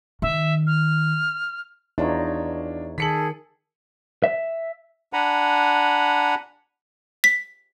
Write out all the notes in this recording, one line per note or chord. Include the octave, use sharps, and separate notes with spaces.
D#3 E5
F6
E2 D4 D#4 F4 C#5
D#3 G#4 A4 B6 C#7 F#7
E5
D4 F#5 G#5 A#5 B5
B6